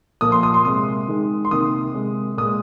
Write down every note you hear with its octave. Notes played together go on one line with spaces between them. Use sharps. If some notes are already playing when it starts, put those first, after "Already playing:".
A#2 F3 A#3 D#6
C6
D#6
C6
C3 G#3 D#6
D#3 G#3
C6
C3 D#3 A#3 D#6
C3 G#3
A#2 G#3 D#6